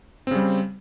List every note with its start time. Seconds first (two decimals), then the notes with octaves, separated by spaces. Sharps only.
0.27 C4
0.31 C#3
0.35 G3